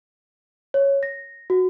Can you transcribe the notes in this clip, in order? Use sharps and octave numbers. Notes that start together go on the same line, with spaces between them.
C#5
A#6
F#4